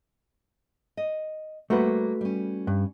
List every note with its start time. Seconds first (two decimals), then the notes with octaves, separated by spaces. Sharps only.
0.97 D#5
1.70 G3 A3 A#3 F#4 B4 C5
2.21 G3 C#4
2.67 G2